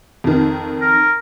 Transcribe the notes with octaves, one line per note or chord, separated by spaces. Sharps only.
F2 D#3
A#4